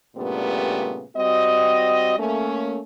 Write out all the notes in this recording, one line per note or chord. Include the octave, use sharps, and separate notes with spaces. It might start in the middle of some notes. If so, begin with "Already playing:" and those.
G2 A#2 C#3 G3 A3 B3
G3 C4 F#4 D#5
A3 A#3 C#4